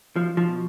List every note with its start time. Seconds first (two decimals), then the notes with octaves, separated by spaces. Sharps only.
0.16 F3
0.37 F3
0.48 B2